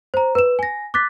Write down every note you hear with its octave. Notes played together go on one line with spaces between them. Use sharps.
C5 A#5
B4 E7
G#5 A#6
D6 F#6 A6 B6